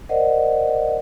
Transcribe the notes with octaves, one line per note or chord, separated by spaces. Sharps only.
A#4 C5 D5 D#5 F#5